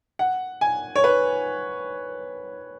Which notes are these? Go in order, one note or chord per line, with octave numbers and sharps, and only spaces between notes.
F#5
G#5
C#5
B4